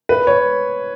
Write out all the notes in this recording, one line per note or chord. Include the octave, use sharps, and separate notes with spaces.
B4
C#5